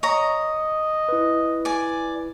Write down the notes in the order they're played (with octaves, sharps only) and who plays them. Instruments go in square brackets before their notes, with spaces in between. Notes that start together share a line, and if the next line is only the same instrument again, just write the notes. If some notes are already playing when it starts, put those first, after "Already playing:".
[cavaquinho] C#5 A#5 [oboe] D#5
[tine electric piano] E4 B4
[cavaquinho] D5 G#5